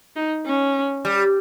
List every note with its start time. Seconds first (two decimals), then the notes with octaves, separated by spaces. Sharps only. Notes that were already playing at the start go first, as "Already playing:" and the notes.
0.16 D#4
0.46 C#4
1.05 G3